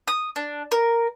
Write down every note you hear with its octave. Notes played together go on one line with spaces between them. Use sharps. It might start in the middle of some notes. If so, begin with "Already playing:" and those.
D#6
D4
A#4